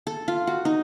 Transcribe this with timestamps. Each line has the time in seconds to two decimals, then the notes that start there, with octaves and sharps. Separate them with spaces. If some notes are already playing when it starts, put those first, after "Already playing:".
0.07 A4
0.28 F4
0.47 F#4
0.65 D#4